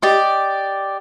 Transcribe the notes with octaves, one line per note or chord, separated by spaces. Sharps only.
G4 D5 D#5 D6